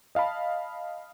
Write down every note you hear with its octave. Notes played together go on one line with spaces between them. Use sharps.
D#5 F5 A5 B5